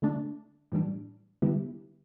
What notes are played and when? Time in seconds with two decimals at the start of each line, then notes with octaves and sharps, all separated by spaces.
0.02 D3 A3 D4
0.72 A2 E3 G3 D4
1.42 D3 G3 B3 E4 G4